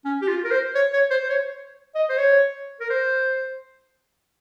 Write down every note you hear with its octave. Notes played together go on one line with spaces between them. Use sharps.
C#4
G4
F4
A#4
C5
C#5
C#5
C5
C5
C#5
D#5
C5
C#5
A#4
C5